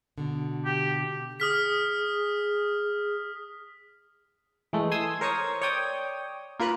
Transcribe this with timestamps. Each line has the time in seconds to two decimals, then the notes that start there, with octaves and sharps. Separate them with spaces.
0.18 B2 D3
0.65 G4
1.40 G#4 D#6 F6 B6
4.73 E3 G#3 A3
4.92 G#5 C6 D#6 E6
5.21 A#4 C5 C#5 C#6 D#6
5.62 C#5 D5 G5 D#6
6.60 A#3 F4 A#4 B4 F#6